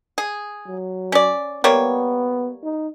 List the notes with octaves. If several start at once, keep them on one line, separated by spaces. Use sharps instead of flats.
G#4
F#3
C#4 D5
G3 A#3 B3 C#5
D#4